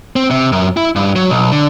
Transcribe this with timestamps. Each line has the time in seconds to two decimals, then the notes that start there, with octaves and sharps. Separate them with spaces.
0.16 C4
0.31 C3
0.52 F#2
0.77 E4
0.96 G2
1.16 F#3
1.30 B1
1.52 D3